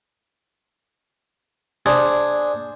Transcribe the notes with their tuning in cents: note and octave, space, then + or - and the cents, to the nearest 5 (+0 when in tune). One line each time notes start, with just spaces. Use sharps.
D4 +0 G#4 +0 C5 +0